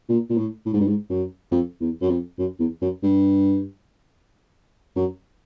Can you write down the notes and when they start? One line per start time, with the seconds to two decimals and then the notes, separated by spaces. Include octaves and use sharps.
0.09 A#2
0.30 A#2
0.38 A2
0.66 A2
0.74 G#2
0.81 G2
0.88 G#2
1.10 F#2
1.52 F2
1.81 E2
2.02 F#2
2.09 F2
2.39 F#2
2.60 E2
2.82 F#2
3.03 G2
4.96 F#2